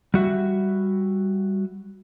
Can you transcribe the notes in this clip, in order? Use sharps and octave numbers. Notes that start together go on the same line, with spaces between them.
G3 F#4 E5